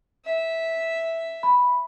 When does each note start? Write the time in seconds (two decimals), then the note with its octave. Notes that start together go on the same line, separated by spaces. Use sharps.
0.25 E5
1.43 B5